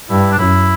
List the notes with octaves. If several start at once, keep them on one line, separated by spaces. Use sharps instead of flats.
G2 E4
D4
F#2 E4